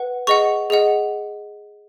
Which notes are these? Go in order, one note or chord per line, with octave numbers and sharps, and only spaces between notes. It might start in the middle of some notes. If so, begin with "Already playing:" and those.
Already playing: B4 F#5
G#4 D#5 F#5 C#6
G#4 D#5 F#5